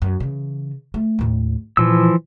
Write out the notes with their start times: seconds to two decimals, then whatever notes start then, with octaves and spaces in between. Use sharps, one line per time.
0.02 F#2
0.20 C#3 E3
0.94 A3
1.19 D#2 A2
1.77 A#2 E3 F3 E6